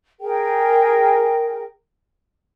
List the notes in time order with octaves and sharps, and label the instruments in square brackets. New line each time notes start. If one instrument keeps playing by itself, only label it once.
[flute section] G#4 A#4 G5